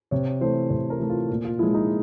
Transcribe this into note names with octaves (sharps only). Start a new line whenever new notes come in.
C3 C#5
E3 A3 C5
C3 C5
A#4
E3 A3
F4
A#2 F4
F4
F3 G#3 E4
D#4